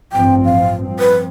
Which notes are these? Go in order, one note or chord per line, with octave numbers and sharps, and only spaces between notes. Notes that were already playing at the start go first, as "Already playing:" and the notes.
A1 G2 F3 C4 G5
F5
G2 F3 C4
B4